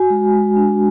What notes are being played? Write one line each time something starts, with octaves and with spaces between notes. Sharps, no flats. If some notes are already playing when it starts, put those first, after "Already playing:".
Already playing: F#4 G#5
G#3
G#3
D4